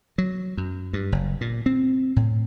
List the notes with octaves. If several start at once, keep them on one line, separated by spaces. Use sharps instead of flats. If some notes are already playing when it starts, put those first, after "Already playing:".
F#3
F#2
G2
F#1
A#2
C4
A2